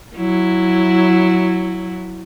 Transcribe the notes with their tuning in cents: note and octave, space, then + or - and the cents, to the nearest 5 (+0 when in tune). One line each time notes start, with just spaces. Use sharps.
F#3 -5 E4 +0